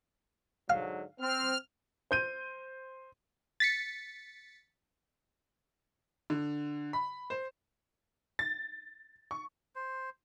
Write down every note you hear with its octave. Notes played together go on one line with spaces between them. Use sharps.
G#2 D3 F#3 F5
C4 F6
C5 G6 D#7
A6 B6 C#7
D3
B5
C5
A6
C#6
C5